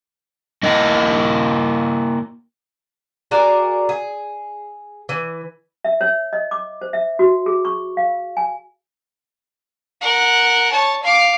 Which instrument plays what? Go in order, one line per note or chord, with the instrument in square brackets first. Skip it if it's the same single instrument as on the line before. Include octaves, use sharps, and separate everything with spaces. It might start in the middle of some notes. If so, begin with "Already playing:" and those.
[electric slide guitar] A#3 E4 A#4 D#5
[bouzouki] F#4 G#4 A#4 D5
G#4
E3
[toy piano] E5
C#5
D#5
D6
C5
E5
F#4
G#4
C#6
F5
G#5
[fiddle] A#4 F#5
C#5 A5
F5 D6